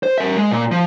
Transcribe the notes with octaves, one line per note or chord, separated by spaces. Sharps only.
C5
A#4 E5
G#3
A#2
F3